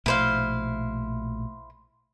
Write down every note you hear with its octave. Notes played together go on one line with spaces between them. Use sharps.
A#1 B2 A3 E4 C5 F5